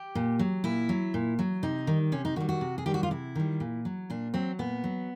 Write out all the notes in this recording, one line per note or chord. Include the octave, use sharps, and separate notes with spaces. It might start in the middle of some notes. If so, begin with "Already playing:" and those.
Already playing: G4
A#2
F#3
A#2 E4
F#3
A#2
F#3
C3 D#4
D#3 G3
C3 C#4
D#4
D#3 G3 F#4
F#4
C3
G#4
D#3 G3 G4
F#4
F4
C3 E4
D#3 G3
A#2
F#3
A#2 D4
F#3 C4
A#2 B3
F#3